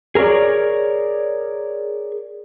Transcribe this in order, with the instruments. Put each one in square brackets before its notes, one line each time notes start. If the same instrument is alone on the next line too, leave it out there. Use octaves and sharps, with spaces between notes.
[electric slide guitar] G#4 A#4 B4 C#5 D5